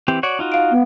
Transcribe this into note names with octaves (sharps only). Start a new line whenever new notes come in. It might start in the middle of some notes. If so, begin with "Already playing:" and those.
E3 C4 G4
F#4 C#5 D5
D#4 F4 F#4
F5 D7
B3